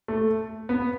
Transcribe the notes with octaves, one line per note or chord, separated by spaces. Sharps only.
A3
B3